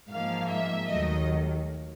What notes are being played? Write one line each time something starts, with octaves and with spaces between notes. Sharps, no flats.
G#2 F3 A#3 F5
E5
D#2 D#3 F#3 A3 D#5